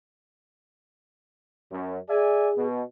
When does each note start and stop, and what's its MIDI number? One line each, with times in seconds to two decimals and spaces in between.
1.72 1.99 42
2.09 2.67 68
2.09 2.49 74
2.09 2.49 76
2.09 2.49 80
2.56 2.83 47